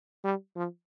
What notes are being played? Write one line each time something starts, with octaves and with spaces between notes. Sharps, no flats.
G3
F3